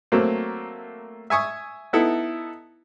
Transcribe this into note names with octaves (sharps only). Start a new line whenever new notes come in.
F#3 A3 A#3 C4
E5 G#5 C#6 D#6
B3 D#4 E4 A4